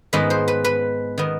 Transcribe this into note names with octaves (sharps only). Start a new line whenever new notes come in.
G#2 D#3 G#3 B3 B4
C5
B4
B4
D#3 B3